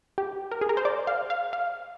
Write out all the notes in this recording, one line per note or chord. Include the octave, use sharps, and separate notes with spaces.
G4
A#4
G#4
A#4
C5
D5
F5
F5
F5